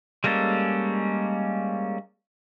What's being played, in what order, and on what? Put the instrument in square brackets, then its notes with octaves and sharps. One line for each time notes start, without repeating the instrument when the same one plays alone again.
[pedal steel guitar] G3 G#3 A#3 C#4 A4